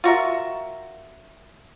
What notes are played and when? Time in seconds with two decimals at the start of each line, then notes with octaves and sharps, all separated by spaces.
0.04 F4 F#4 A#4 E5